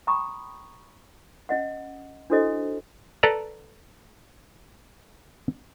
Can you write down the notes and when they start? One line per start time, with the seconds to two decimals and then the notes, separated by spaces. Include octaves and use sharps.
0.07 G5 A#5 B5 C#6 D#6
1.49 C#4 D#5 F#5
2.30 D4 E4 F#4 A4 C5 D#5
3.23 A4 B4 D5 A5 A#5